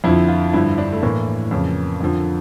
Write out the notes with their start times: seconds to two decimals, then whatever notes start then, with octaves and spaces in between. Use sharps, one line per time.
0.04 F2 D3 F3 E4
0.28 F4
0.53 G2 D3 F3 E4
0.78 D4
0.93 A3
1.03 A2 E3 A#3
1.51 F2 C#3 E3
2.01 F2 D3 F3